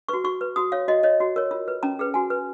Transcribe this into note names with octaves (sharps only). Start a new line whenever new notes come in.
F#4 B4 C#6
F#4 C#6
B4
F#4 D#6
C#5 F5
F#4 D#5
C#5 D#5
F#4
A#4 C#5
F4
B4
C#4 A#5
G#4 B4
F#4 G#5
B4